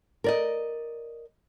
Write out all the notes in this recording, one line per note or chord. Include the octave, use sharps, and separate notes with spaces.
A#4 D5 D#5